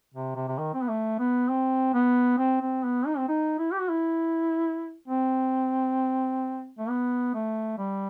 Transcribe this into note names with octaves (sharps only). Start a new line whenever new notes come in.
C3
C3
C3
D#3
C4
B3
A3
B3
C4
B3
C4
C4
B3
D#4
C4
D#4
E4
G4
F#4
E4
C4
A3
B3
A3
G3